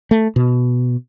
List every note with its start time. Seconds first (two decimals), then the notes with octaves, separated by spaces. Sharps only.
0.11 A3
0.36 B2